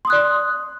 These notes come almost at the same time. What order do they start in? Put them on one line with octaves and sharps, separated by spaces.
C6 D#6 F#6 D5